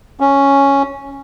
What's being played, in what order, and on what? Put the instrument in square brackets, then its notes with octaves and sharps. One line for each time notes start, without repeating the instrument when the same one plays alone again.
[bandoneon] C#4